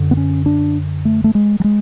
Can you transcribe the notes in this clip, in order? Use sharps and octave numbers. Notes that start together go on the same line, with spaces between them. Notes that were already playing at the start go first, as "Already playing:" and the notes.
Already playing: F#2 D3
B3
C#4
D4
A3
A3
G#3
F#3
G#3